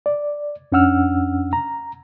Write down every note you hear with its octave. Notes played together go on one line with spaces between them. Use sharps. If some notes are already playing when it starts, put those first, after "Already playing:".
D5
F2 C#4 D4 F#5 E6 F6
A#5